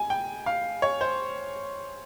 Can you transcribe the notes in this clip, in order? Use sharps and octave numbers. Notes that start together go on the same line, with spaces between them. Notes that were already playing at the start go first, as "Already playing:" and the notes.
Already playing: G#5
G5
F5
C#5
C5